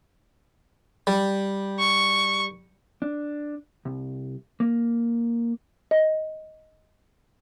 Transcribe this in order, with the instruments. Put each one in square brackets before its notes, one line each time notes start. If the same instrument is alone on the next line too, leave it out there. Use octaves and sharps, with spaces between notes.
[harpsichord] G3
[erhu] C#6
[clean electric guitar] D4
C2
A#3
[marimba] D#5